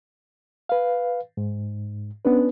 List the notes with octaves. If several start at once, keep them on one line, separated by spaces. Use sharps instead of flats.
B4 F5
G#2
B3 C#4 D4 B4